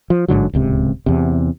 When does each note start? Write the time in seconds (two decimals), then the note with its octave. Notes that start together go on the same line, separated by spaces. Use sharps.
0.10 F3
0.28 A1 G#2 D3 F#3
0.53 D1 C#2 C3
1.06 E2 C3